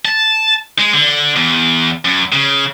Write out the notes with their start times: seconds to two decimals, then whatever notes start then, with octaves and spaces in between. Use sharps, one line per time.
0.05 A5
0.79 G#3
0.93 D3
1.36 E2
2.05 F#2
2.33 C#3